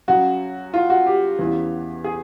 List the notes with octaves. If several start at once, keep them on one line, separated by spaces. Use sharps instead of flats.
F#2 C#3 F#3 F#4
F4
F#4
G4
E2 C#3 E3
G#4